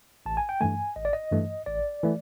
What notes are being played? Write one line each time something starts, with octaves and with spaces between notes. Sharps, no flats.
A1 A5
G#5
G5
G2 E3 A3 G#5
A1 D#5
D5
D#5
G2 E3 A3
A1 D5
E3 A3